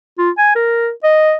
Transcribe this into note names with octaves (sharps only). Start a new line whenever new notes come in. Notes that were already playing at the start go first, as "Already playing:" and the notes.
F4
G#5
A#4
D#5